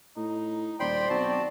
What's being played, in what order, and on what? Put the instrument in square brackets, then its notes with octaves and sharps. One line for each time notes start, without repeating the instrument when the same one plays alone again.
[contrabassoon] A2 [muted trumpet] D#4
[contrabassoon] D#1 [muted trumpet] C5 [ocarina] D5 [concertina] G5 B5 C6
[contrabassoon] B1 [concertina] C4 F#4 A5